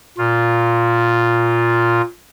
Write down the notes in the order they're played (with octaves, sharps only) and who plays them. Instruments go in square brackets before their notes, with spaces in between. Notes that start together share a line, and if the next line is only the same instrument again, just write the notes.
[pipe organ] A#2 F4